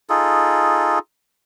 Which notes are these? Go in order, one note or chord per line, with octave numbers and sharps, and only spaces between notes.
D#4 F4 G#4 A4